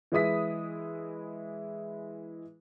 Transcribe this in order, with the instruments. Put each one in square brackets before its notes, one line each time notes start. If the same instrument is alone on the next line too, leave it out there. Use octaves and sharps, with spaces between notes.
[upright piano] E3 G#3 E4 D#6 B6